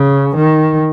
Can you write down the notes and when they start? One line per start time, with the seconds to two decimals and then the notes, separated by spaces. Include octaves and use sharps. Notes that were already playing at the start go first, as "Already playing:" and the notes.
Already playing: C#3
0.35 D#3